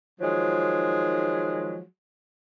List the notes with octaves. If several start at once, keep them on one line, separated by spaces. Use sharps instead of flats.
D#3 F3 F#3 G#3